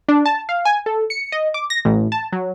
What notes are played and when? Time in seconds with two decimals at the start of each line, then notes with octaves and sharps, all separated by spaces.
0.09 D4
0.26 A5
0.49 F5
0.65 G#5
0.86 A4
1.10 C#7
1.32 D#5
1.54 D6
1.70 A#6
1.85 A1
2.12 A5
2.32 F#3